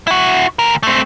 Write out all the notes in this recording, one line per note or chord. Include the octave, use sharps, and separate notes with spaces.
E4 F#4
D2 A#4
A3 C4